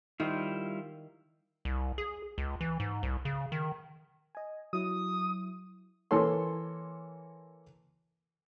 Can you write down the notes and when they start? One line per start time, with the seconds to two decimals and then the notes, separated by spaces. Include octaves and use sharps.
0.20 D#3 G3 E4 F4 C5
1.65 C2
1.98 G#4
2.38 C#2
2.61 E3
2.80 G#2
3.03 C2
3.25 C#3
3.52 D#3
4.35 D#5 G#5
4.73 F#3 E4 D#6
6.11 E3 A#3 A4 C#5 C6